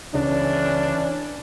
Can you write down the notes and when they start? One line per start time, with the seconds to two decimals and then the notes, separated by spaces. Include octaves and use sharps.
0.14 C#2 C#3 E3 C#4 D4